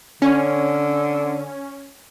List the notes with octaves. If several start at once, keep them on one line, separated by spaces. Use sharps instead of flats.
D3 C#4